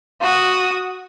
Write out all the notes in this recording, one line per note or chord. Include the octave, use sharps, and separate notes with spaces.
F#4 D#6